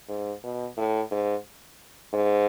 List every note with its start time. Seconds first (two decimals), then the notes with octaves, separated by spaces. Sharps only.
0.09 G#2
0.44 B2
0.77 A2
1.11 G#2
2.13 G#2